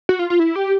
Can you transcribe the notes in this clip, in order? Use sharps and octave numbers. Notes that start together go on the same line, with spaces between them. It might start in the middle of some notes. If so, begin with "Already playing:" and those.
F#4
F4
F4
E4
G4